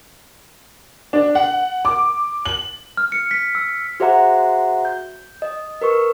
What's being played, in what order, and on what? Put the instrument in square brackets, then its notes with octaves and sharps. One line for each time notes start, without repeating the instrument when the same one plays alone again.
[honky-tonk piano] D4
F#5
D6
F#7
[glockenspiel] F6
C#7
B6
E6
[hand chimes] F#4 G#4 C5 E5 F#5 A#5
G6
D#5
A#4 B4 C#6